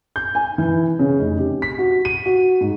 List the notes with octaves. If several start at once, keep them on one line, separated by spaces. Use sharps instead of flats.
G6
G#5
E3
C#3
F1
G4
B6
F#4
D#7
F#4
G#2